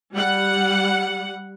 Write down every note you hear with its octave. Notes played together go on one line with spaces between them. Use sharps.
G3 F#5